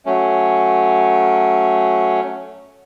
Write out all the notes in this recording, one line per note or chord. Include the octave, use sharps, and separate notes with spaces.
F#3 A3 C#4